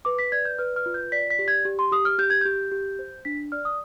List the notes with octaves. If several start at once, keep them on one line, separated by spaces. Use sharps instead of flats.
B4 D6
B6
D5 G#6
G6
B4 F6
F6
F4
G6
D5 B6
B6
G4
G#6
G4
C6
G4 D#6
F6
G4 G6
G#6
G4 G6
G4
C5
D4 B6
D5 F6
D#6